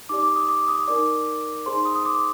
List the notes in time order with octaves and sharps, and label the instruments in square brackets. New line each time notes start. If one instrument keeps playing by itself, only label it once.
[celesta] D#4 G4 D5 D6
D6
D#6
D6
D#6
D#4 A#4 D5 D6
D#4 G#4 C5 C6
D#6
D#6
D6